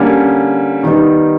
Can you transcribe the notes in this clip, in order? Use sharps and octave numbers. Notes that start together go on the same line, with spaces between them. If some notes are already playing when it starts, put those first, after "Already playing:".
Already playing: D3 G3 A#3 C#4
D#3 G3 B3 D#4